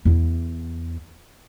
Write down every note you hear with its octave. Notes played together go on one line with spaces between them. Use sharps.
E2 E4